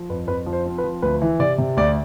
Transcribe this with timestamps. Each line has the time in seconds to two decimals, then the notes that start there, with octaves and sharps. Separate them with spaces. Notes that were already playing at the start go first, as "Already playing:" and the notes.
Already playing: F3
0.10 F2 B4
0.27 F2 B4
0.46 F3
0.53 C5
0.66 C4
0.78 B4
0.84 F3
1.02 D2 B4
1.22 E3
1.39 C3 D5
1.58 C3
1.77 D2 D5